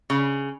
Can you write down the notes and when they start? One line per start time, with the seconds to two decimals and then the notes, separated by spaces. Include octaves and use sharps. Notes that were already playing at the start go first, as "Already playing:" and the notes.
0.10 C#3